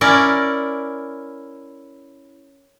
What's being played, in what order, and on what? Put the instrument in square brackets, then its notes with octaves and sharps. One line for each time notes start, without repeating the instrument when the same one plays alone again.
[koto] C#4 E4 A#4 D5